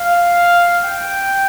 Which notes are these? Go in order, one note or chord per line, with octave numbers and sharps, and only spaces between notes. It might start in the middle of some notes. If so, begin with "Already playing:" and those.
Already playing: F5
G5